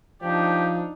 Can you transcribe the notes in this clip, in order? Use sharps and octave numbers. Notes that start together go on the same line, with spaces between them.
F3 D4 D#4 G4